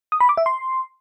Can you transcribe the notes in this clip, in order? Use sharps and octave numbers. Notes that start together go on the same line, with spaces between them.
D#6
B5
D6
E5
C6